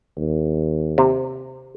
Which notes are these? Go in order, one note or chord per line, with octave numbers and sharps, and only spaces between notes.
D#2
C3